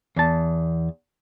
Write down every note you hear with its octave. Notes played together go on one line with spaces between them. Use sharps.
E2 A5